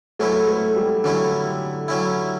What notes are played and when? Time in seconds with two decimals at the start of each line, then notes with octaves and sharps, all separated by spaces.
0.19 F#3 A3 C#4 E4
0.48 A3
0.76 G3
1.04 D3 F#3 C#4 E4
1.88 F#3 C#4 E4